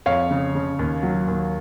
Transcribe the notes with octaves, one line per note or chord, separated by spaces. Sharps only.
F2 C#5 F5
C#3
C#3
D#2
F#3
D#2